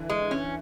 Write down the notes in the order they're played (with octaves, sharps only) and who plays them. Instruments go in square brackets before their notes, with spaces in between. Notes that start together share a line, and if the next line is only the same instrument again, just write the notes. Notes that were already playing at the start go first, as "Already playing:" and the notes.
Already playing: [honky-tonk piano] D3 E3
[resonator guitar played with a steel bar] G#3
C#4